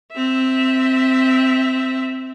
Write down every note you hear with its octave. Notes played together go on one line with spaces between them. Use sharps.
C4 E5